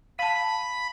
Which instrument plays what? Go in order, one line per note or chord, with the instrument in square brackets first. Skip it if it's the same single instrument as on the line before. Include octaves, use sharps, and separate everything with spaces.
[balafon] F5 A5 [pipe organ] B5